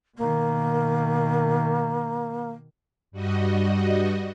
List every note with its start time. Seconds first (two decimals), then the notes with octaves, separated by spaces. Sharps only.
0.17 B2 D#3 A#3
3.11 G2 G3 F#4 D#5